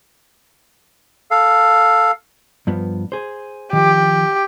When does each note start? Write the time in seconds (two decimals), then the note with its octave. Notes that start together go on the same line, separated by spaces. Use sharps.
1.31 A4 F5
2.67 G2 F3 B3
3.12 G#4 C5
3.73 D#3 F3 G4